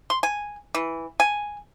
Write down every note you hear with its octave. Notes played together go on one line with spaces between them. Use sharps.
C6
G#5
E3
G#5